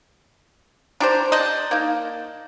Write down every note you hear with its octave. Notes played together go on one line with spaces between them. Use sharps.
D4 G4 C5 A#5
D5 D#5 A5 G6
A#3 D#4